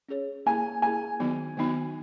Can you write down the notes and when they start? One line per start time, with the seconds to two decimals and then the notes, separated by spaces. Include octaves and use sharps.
0.09 C#4 G#4 C#5
0.46 A#3 E4 G#4 G#5
0.82 A#3 E4 G#4 G#5
1.20 D#3 F#3 B3 D#4 F#4
1.57 D#3 F#3 B3 D#4 F#4